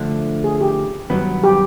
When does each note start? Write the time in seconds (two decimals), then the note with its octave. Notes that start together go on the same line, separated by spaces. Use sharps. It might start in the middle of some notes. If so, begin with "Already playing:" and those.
Already playing: D3 F3 A3 D4 A4
0.44 G#4
0.61 G4
1.10 G2 D#3 F#3 B3
1.44 G4